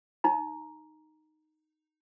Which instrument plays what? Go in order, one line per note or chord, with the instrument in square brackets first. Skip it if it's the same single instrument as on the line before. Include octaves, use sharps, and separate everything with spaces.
[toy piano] D#4 A#5